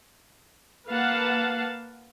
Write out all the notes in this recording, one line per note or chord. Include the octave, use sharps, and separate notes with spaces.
A#3 B4 F5 F#5 A5